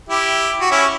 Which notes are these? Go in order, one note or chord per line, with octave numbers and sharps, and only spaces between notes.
E4 G4
F#4
C#4 E4